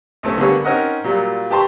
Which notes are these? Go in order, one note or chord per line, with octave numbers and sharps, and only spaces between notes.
B1 A3 C#4
D3 G3 A#3 B3 G#4 C#5
C4 C#4 D#4 A#4 D#5 F#5
A#2 F#3 G3 F4
G4 B4 A5 A#5 C6 C#6